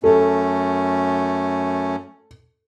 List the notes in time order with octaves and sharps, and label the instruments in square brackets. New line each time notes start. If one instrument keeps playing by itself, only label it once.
[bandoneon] F#2 A3 C#4 [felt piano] A4